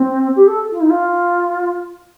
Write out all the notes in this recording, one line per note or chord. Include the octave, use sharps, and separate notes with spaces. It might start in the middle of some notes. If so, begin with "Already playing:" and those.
Already playing: C4
G4
A4
F4
D#4
F4